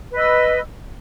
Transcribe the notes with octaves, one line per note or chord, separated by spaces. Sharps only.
B4 D#5 E6